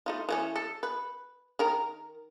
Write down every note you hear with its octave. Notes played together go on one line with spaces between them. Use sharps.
A3 D#4 F4
E3 A3 C#4
A4
B4
D#3 A#4 A#5